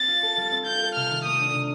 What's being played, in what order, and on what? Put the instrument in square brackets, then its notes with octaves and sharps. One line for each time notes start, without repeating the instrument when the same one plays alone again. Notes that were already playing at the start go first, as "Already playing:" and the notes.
Already playing: [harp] C4 [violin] A6
[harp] F4
A4
G3
C4
[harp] F4 [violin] G6
[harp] A4
[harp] C3 [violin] F6
[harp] D#3
[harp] A3 [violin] D#6
[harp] D4
C3